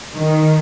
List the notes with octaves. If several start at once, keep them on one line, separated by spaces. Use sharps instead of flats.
D#3